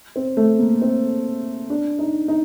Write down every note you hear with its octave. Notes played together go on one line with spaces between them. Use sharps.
C4
A3
A#3
C4
D4
D#4
D#4